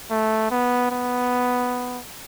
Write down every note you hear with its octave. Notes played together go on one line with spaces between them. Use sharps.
A3
B3
B3